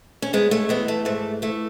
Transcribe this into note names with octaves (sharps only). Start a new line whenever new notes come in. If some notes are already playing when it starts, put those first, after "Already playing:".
C#4
G#2 G#3 B3
A3 C#4
E3 G#3 B3
A3
G#2 A3
E3 A3